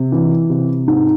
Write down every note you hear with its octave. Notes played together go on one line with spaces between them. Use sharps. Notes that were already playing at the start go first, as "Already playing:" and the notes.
Already playing: C3
E3
C3
G#2